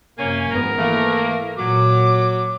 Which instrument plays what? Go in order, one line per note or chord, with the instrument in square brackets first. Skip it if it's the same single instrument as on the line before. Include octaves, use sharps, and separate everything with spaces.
[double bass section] F#2 C3 [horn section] A#3 C#4 G#5
[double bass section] G#1 F3 B3 [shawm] A#4
[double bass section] E3 [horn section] A3 A#3
[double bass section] A#2 [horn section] F#3 [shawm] D6